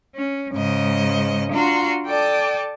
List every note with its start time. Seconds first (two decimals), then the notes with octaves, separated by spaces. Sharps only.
0.15 C#4
0.54 G#2 C#3 G#3 C5 D#5
1.51 D4 F4 F#4 A#5 C6
2.06 A4 D5 G5 A5 D6 D#6